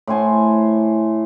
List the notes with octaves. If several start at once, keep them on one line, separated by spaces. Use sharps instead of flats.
A2 C5 G#5 A5